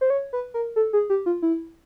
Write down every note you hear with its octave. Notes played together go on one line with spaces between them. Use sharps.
C5
C#5
B4
A#4
A4
G#4
G4
F4
E4